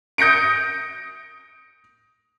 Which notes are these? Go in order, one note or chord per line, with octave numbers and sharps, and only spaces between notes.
D#6 G6 A#6 C#7 D7